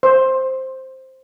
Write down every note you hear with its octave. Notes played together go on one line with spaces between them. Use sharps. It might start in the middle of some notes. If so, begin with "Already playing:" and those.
C5